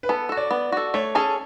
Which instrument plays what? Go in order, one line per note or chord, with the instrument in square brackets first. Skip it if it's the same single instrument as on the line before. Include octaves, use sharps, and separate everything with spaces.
[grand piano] B4
[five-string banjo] B3 [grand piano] A4
[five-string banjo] F#4 A4
[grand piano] D5
[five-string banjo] B3
F#4 A4
[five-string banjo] A3 [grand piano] C#5
[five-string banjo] C#4 G#4 [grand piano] A4